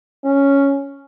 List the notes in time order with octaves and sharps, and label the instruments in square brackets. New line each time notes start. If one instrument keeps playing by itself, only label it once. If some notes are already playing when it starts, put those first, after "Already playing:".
[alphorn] C#4